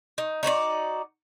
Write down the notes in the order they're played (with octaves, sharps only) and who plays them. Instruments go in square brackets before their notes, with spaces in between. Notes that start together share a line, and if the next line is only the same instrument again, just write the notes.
[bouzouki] D#4
D#4 F#4 C5 D5